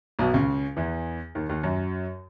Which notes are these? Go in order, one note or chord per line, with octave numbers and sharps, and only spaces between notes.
B1 B2
C#2 C#3
E2 E3
D#2 D#3
D#2 D#3
F#2 F#3